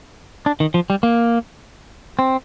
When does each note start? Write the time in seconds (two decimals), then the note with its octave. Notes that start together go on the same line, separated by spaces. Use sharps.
0.46 D4
0.60 D#3
0.74 F3
0.90 G3
1.03 A#3
2.19 C4